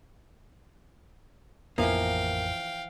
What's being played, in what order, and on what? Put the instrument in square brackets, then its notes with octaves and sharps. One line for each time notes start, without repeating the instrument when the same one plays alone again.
[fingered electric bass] A1 F2 B3 [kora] E3 F3 [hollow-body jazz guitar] A#3 [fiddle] F5 G5